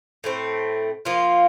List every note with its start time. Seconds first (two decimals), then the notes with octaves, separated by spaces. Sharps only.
0.24 A2 A3 C4
1.05 F3 A#3 F4